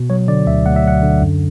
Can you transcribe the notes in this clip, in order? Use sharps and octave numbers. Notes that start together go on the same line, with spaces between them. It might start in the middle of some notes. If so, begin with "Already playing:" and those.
Already playing: B2
F#3 C#5
D3 D5
D2 E5
D2 F#5
E5
F#3 F#5
D3
F#2